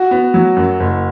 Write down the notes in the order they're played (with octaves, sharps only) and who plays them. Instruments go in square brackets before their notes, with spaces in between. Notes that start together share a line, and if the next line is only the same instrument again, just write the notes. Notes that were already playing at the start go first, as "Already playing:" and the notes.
Already playing: [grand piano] F#4
[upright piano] B3
F#3
F#2
F#1